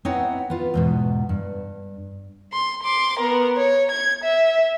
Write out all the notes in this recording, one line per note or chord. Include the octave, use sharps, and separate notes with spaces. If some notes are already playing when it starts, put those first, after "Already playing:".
B3 C4 D#4 E4 C#5 F#5
B3 F4
E2 G#2 B2
G2
C6
C6 D6
B3 A#4
C#5
G#6
E5